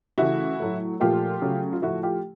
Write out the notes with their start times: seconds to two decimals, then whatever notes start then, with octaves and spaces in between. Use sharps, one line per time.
0.18 C#3 E3 A3 E4 F#4
0.60 A2 F#3 A3
1.00 A#2 F3 A3 F4 G4
1.42 C#3 F#3 A3
1.73 F4
1.82 A2 F3 A3 E4 F#4
2.03 F4 G4